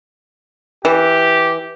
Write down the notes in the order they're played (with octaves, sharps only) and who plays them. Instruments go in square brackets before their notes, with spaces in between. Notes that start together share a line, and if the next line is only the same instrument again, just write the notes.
[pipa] E3 [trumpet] G4